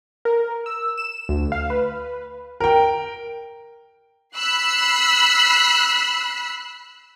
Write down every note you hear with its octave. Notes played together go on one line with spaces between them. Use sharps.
A#4
E6
E7
D2
F5
B4
A#4 G5
B5 E6 F#6 C7